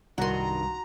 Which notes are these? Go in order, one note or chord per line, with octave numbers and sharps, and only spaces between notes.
C2 G2 D#3 F#4 A#5 C6